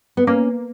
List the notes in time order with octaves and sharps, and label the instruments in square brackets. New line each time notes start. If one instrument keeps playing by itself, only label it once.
[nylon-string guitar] B3
[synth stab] A#3 [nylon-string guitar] C#4